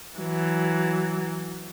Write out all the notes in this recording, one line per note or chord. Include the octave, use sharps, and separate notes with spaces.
E3 F#3